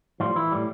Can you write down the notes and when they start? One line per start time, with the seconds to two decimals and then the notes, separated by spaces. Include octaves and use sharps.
0.20 A2 F3 G3 F4
0.36 E3 E4
0.52 A2 G3